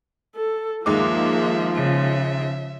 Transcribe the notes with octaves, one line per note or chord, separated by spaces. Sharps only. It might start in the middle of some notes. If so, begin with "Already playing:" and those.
A4
D#2 F3 G#3 A#3 E5 D6
C#3 E5